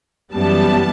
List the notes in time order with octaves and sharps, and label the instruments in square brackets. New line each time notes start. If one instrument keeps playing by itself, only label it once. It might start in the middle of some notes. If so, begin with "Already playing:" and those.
[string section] F#2 E3 G3 B3 A5